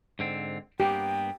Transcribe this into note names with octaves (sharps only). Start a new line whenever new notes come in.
G#2 D3 C4
G2 A#3 B3 G4 G5